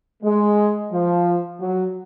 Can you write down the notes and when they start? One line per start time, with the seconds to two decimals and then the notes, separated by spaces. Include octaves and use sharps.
0.23 G#3
0.92 F3
1.60 F#3